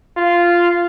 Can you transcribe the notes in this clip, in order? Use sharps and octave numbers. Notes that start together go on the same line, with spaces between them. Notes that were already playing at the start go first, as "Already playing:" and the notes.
F4